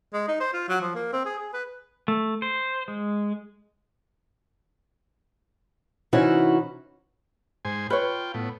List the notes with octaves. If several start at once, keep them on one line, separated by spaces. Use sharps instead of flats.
G#3
D#4
C5
F4
F#3
F3
A#3
C4
G#4
G#4
B4
A3
C5
G#3
C3 E3 C#4 D#4 E4 F#4
G#2 C5 G#5
F4 B4 C#5 G5
A2 B3